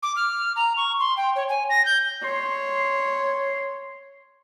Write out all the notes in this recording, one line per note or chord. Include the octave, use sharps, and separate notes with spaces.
D6
F6
A#5
C#6
C6
G5
C#5
G#5
A#6
G6
C#5 C6